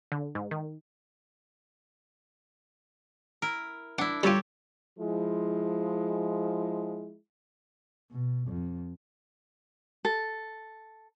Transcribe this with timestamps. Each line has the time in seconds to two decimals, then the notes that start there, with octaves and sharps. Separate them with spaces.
0.12 D3
0.35 G#2
0.51 D#3
3.42 E4 A#4
3.98 D4 E4 F#5
4.23 G3 F4 G4 A4 C#5
4.99 F3 G#3 E4
8.12 B2
8.48 F2
10.05 A4